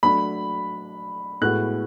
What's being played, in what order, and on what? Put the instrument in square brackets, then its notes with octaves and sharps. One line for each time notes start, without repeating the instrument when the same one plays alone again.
[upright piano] F#3 A3 D4 [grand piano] B5
[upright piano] A2 G#3 B3 F#4 [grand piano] F#6